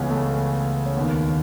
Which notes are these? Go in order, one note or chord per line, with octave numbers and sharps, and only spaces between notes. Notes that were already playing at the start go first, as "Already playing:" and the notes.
Already playing: C#2 C#3 E3 B3 C#4
A3
C#4
D#2 D#3 B3